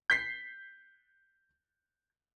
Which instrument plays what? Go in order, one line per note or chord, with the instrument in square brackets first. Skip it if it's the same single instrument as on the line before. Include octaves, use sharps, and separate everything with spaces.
[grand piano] G6 B6 C7